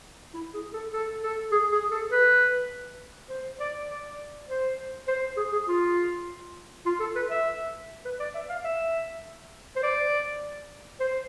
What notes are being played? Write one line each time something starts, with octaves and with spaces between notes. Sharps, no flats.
E4
G#4
A4
A4
A4
G#4
G#4
A4
B4
C5
D5
D5
C5
C5
G#4
G#4
F4
F4
A4
B4
E5
B4
D5
E5
F5
E5
C5
D5
C5